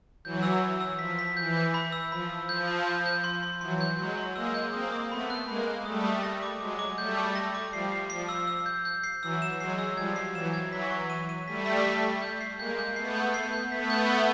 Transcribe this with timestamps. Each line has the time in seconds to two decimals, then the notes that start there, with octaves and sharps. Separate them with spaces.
0.24 E3 F#3 G6
0.43 E6
0.62 E6
0.81 E6
0.99 F3 B6
1.19 B6
1.37 E3 G6
1.56 G6
1.74 B5
1.92 E6
2.12 F3 B5
2.30 E6
2.49 F3 G6
2.67 B5
2.87 G6
3.06 G6
3.24 C6
3.43 C6
3.61 E3 F#3 C6
3.81 G6
3.99 F#3 G#3 C6
4.17 C6
4.36 G#3 A#3 E6
4.54 G6
4.73 A#3 C4 D#6
4.92 D#6
5.11 A3 B3 B5
5.30 F#6
5.48 G#3 A#3 B5
5.67 F#6
5.86 G3 A3 D#6
6.04 D#6
6.23 A#6
6.43 D6
6.61 F#3 G#3 D6
6.79 D6
6.98 G3 A3 G6
7.17 D6
7.35 A#6
7.54 D6
7.73 F3 G3 C7
7.92 C7
8.10 F3 C7
8.29 E6
8.47 E6
8.66 G6
8.85 G6
9.04 C7
9.22 E3 F#3 E6
9.42 E7
9.60 F#3 G#3 C7
9.79 E6
9.97 F3 G3 G#6
10.16 C7
10.35 E3 F#3 E7
10.54 G#6
10.72 E3 F#3 B6
10.90 C#6
11.10 D#7
11.29 D#7
11.47 G3 A3 B6
11.66 B6
11.85 B6
12.04 B6
12.22 G6
12.41 C7
12.59 G#3 A#3 G6
12.79 G6
12.96 A3 B3 C7
13.15 G6
13.34 C7
13.53 G6
13.71 A3 B3 B6
13.90 G6
14.10 G7